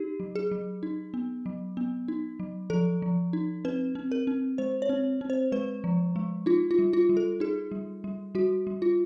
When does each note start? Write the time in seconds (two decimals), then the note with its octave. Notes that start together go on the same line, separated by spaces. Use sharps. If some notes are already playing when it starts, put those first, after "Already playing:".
Already playing: D#4 G4
0.20 F#3
0.36 G#4
0.51 F#3
0.83 D#4
1.14 B3
1.46 F#3
1.77 B3
2.08 D#4
2.40 F#3
2.70 F3 A4
3.02 F3
3.33 D#4
3.65 C4 B4
3.95 C4
4.12 A#4
4.27 C4
4.58 G#3 C5
4.82 C#5
4.89 C4
5.21 C4
5.30 C5
5.52 G#3 B4
5.84 F3
6.16 G#3
6.46 D#4 F4
6.71 F4
6.79 G3
6.93 F4
7.09 G3
7.17 A4
7.40 D#4 G#4
7.71 G3
8.04 G3
8.35 G3 F#4
8.67 G3
8.82 F4